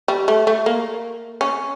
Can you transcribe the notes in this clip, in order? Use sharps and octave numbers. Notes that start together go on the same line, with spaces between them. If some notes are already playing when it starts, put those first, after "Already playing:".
G3
A3
A3
A#3
C#4